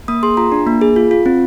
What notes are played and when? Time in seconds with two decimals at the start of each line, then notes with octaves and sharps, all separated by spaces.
0.08 A#3 D#6
0.23 G#4 C6
0.37 F4 A#5
0.52 D4
0.67 A#3
0.81 G#4
0.96 F4
1.11 F4
1.26 C4